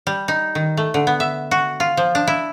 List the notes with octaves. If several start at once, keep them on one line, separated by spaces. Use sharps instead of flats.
G3
D#4
D#3
A3
D3
B3
E5
F#4
F4
F3
D4
E4